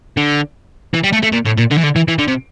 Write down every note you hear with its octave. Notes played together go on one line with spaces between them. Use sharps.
D3
E3
G3
A3
A3
A#2
A2
A#2
D3
E3
D3
E3
E3
D3
C3